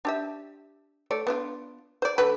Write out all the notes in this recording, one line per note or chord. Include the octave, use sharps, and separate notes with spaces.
D4 G4 E5
A3 C#5 D5
B3 D4 F4
C5 D5
D3 A3 B4